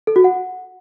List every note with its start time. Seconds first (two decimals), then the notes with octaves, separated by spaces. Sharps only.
0.07 A4
0.16 F#4
0.24 F#5